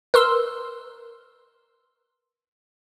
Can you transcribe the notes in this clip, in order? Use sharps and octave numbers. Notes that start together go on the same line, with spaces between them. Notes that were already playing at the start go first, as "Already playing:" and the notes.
A#4 B4 C6 E6